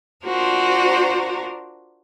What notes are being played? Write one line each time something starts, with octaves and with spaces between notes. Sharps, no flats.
D4 F4 F#4 A#4 C5